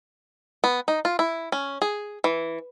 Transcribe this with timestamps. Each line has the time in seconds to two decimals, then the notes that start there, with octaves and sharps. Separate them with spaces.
0.64 B3
0.88 D#4
1.05 F4
1.19 E4
1.52 C#4
1.82 G#4
2.24 E3